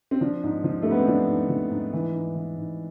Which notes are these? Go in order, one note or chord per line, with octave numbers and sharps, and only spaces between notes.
C4
F3 D4
G#2
F3
G#2 A3
B3
C4
F3 D4
G#2
F3
G#2
E3
G#2
E3
G#2